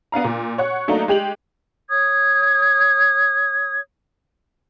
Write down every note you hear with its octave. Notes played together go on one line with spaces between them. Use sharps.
B3 D4 F5 A#5
A#2
C#5 F#5 C#6
F#3 A3 A#3 D4 D#4
G#3 G4 F7 F#7
C#5 D#6 G#6